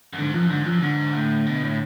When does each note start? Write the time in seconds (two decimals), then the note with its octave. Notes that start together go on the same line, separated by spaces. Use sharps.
0.13 F#2
0.18 G#2 D3
0.34 F#2 F3
0.50 G#2 D3
0.66 F#2 F3
0.82 G#2 D3
1.15 A2
1.46 B2
1.63 A2